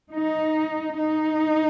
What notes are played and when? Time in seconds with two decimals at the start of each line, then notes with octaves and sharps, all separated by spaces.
0.11 D#4
0.98 D#4